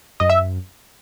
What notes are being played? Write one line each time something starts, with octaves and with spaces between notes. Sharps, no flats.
F#2 D#5
E5